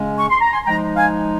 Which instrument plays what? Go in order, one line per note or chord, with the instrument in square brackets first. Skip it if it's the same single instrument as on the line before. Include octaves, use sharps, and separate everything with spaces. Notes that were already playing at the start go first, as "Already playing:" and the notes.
Already playing: [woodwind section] C#3 G#3 C#4 F4
C#6
C6
A#5
G#5 C6
F3 G#3 D#4 G5 A#5
F5 G#5